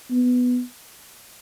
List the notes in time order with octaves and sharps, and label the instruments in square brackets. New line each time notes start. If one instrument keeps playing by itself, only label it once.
[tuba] B3